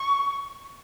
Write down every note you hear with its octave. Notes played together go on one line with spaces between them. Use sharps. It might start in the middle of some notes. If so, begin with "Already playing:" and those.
Already playing: C#6